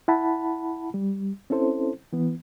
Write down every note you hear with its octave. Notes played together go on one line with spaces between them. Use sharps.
E4 F#5 A5 B5
G3
C4 C#4 E4 A4 C5
E3 B3